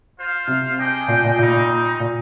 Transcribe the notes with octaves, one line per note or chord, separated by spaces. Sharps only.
F4 C5 F5
C3
D4 G#4 D#5 G5
A#2
A#2
A#2 G3 C4 D#4
A#2